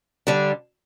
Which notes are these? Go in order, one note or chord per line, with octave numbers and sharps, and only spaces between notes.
D3 G3 D4